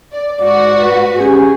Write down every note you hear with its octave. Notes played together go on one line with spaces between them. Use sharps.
D5
G#2 F#4 D5
B4
C#4 G4 G#4 G#5